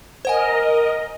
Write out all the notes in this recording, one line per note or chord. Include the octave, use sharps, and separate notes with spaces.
A#4 C5 D#5 F#5 G#5